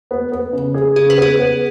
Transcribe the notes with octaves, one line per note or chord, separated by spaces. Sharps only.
B3
B3
C#3
G#4
C#3 G#4
B4
B3 G#4
B3